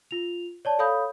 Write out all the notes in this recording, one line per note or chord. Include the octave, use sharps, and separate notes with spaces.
F4 F7
C#5 D5 A5
A4 C#5 F5 B5 D#6 G6